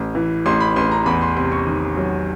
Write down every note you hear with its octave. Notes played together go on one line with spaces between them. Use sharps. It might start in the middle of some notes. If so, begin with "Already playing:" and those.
Already playing: A1
E3
A1 C6
B5
A1 C6
A#5
E2 B5
C6
C3 C6
C#6
D#3
F#3